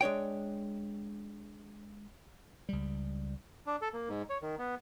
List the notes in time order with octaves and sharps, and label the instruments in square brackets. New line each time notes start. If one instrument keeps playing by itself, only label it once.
[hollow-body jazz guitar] G#3 D4 C#5 G5
[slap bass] C#2 G3
[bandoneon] D4
A4
A#3
G#2
C#5
D#3
B3